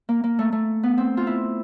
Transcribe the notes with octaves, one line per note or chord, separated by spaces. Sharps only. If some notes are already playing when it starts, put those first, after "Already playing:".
A#3
A#3
A3
A3
B3
C4
F4
E4